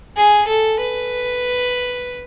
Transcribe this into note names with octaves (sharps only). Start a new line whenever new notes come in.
G#4
A4
B4